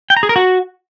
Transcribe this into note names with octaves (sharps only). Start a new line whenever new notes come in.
G5
A#5
G#4
A#4
F#4